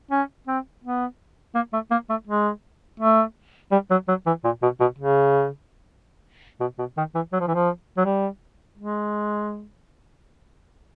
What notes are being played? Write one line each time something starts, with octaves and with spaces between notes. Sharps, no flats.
C#4
C4
B3
A#3
A3
A#3
A3
G#3
A3
G3
F#3
F#3
E3
A#2
B2
B2
C#3
B2
B2
D#3
E3
F#3
F3
E3
F3
F#3
G3
G#3